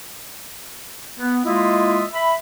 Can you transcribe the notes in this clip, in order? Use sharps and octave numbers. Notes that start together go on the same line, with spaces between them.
B3
G#3 A#3 E4 F4 D#5 E5
E5 B5